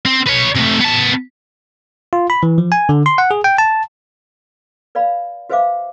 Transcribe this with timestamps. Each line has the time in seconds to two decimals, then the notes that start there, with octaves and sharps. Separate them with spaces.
0.06 C4
0.27 B4 C#5
0.56 C3 A3
0.81 B3 A5
2.13 F4
2.30 B5
2.43 E3
2.58 F3
2.72 G#5
2.89 D3
3.06 C6
3.18 F#5
3.31 G#4
3.44 G5
3.58 A5
4.95 B4 D5 F5 B5
5.49 F#4 B4 C5 E5 F5 D6